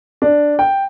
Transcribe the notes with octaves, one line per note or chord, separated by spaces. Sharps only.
D4
G5